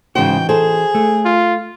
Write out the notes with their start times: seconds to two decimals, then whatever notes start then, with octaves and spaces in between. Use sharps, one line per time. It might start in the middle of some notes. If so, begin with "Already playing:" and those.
0.15 G#2 C#3 E3 D#4 F#4 C5 G5
0.49 G#4 A4 C5
0.95 A3
1.25 F4